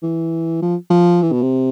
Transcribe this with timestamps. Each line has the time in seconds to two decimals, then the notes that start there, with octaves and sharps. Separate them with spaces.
0.03 E3
0.62 F3
0.90 F3
1.23 E3
1.32 B2
1.42 C3